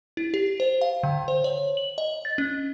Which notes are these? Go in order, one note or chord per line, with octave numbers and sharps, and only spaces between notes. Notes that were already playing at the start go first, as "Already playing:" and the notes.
E4
G4
C5
F5
D3
C5
C#5
F#7
D#5
A6
C#4